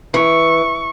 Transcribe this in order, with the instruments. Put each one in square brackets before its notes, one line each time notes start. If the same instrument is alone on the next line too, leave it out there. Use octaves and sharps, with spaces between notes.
[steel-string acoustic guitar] E3 [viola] C#6